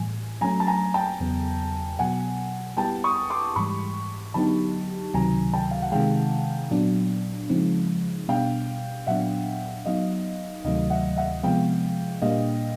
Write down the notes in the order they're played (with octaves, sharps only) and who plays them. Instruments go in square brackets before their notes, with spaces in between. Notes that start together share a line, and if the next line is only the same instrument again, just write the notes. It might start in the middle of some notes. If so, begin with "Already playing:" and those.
Already playing: [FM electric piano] A2 E3 G3 [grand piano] G#5
[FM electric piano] F#3 A3 C#4 [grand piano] G#5 A#5
[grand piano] A5
G#5 A#5
G5 A5
[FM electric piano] E2 C#3 F#3 B3
[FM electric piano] B2 F#3 B3 [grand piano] F#5 G#5
[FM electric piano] G3 B3 E4 G4 B4 [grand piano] G5 A5
[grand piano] C#6 D#6
C6 D6
[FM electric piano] G#2 E3 G3 [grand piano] B5 C#6
[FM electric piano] D3 F#3 B3 D#4 G4 [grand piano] A5 B5
[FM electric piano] C#2 C3 D#3 F#3 [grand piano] G#5 A#5
[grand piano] G5 A5
F5
F#5
[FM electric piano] C3 D#3 G#3 [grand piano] F5 G5
[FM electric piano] A#2 F#3 B3 D4
C#3 F3 G#3 C4 D#4
[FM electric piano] B2 G3 B3 D4 [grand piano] F5 G5
[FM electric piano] A#2 F#3 B3 D4 [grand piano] E5 F#5
[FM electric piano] F#3 B3 D#4 [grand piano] D#5 F5
[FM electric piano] D2 C3 D#3 F#3 A3 [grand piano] D#5 F5
[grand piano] E5 F#5
E5 F#5
[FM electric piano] C3 F3 G#3 B3 [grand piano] F5 G5
[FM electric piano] A#2 G3 A#3 D4 [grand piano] D#5 F5